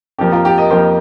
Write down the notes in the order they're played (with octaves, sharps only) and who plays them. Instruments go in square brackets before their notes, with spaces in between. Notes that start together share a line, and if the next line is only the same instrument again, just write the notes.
[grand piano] F2 F3 A#3 G4
F4 A#4
G4
A#4 D#5
F2 F3 A#3 G4 C5